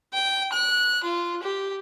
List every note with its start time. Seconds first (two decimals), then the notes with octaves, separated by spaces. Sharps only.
0.14 G5
0.53 F#6
1.03 F4
1.43 G4